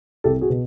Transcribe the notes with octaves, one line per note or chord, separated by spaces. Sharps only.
C2 G4 A4
F#4 G#4
B2